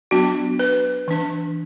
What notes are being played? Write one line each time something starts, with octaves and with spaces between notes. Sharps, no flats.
F#3 B3 D4 F#4
B4
E3 D4